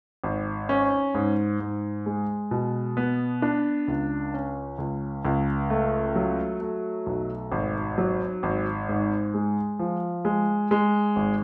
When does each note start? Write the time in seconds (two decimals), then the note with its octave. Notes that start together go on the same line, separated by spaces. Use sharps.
0.24 G#1
0.69 C#4
1.15 G#2
1.60 G#2
2.06 G#3
2.51 B2
2.97 B3
3.42 D4
3.88 C#2
4.34 C#4
4.78 C#2
5.25 C#2
5.70 A3
6.16 F#3
6.61 A3
7.06 B1
7.52 G#1
7.98 F#3
8.43 G#1
8.89 G#2
9.34 G#3
9.79 F3
10.25 G#3
10.71 G#3
11.16 G#1